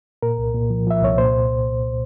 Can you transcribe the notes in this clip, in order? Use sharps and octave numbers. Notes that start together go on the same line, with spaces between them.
A#2 A#4
C2
A#2
F3
F3 E5
C2 C#5
A#2 C5